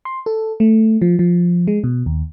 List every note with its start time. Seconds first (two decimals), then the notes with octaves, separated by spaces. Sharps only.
0.05 C6
0.26 A4
0.60 A3
1.02 F3
1.19 F3
1.67 G#3
1.84 B2
2.06 D#2